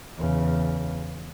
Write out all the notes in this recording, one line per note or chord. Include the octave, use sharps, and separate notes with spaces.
E2 C#3